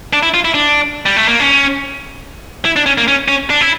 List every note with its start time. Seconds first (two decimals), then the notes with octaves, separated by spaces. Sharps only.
0.13 D4
0.23 E4
0.34 F4
0.45 E4
0.54 D4
1.06 G3
1.17 A3
1.28 A#3
1.40 C#4
2.65 E4
2.76 D4
2.86 C#4
2.98 A#3
3.08 C#4
3.28 C#4
3.50 D4
3.61 E4